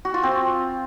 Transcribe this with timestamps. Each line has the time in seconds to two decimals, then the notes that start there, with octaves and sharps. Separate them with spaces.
0.05 F#4
0.14 F4
0.23 C4